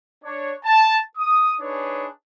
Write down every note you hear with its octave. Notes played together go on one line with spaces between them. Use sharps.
D4 C#5
A5
D#6
D4 D#4 G#4 B4 C#5